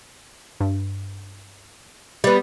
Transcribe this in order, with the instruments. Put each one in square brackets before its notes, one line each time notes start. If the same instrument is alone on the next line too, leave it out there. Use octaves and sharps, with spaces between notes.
[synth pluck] G2
[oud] G3 B3